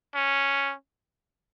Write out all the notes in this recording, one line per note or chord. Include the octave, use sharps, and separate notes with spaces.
C#4